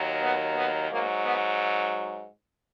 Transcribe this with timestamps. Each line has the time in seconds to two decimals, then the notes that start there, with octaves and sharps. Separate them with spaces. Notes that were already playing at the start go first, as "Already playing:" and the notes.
Already playing: D#2 D#3 F#3
0.22 B3
0.56 B3
0.90 G#2 F#3 A#3
1.24 B3